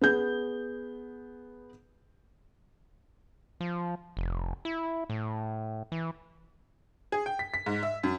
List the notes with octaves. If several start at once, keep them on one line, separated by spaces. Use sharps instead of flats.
B3 G#4 G6
F3
F1
E4
A2
E3
G#4
G5
B6
B6
G#2
E5
F#2